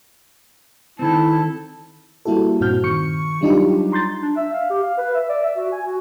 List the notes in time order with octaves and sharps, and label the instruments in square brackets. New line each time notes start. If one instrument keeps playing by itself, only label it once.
[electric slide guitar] D#3 C4 [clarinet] E4 [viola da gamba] A4
[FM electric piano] G3 A#3 E4 F#4 A4
G2 A#2 C4 F#4 F6 G6
D#3 C#6 C#7
F#3 G3 D4 D#4 F4 G4
A#5 C6 G6 A6
[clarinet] D4
E5
F5
G4
F5
B4
E5
D5
E5
F#4
G#5
F#4